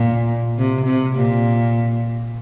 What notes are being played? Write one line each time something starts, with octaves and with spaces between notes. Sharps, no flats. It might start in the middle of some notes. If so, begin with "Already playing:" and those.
Already playing: A#2
C3
C3
A#2